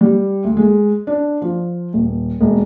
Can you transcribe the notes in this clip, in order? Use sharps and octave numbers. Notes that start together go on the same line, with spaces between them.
G3
D2
G#3
D4
F3
D#1
E1